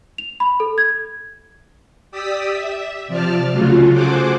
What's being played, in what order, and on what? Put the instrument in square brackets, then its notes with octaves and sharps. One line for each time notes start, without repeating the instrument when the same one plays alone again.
[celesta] F7
B5
A4
G#6
[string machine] G4 D5 D#6 E6 B6
E5
C3 F3 D5 A5 F6
C#3 F#3 A3 F4 F#4
F#4 G#4 A4 C5 F#5 D6